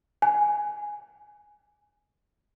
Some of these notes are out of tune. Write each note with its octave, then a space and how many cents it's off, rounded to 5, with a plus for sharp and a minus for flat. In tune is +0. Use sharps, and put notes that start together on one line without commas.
G#5 +5